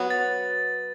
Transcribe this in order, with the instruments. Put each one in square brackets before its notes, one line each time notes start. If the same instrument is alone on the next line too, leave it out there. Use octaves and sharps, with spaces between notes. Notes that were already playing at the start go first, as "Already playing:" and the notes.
Already playing: [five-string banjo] F#3 B3 F#4
[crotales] A6